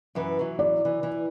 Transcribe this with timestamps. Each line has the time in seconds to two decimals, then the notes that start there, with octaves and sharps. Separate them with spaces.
0.15 F#2 E3 B4
0.39 E3 F#3
0.59 D5
0.85 E3
1.03 E3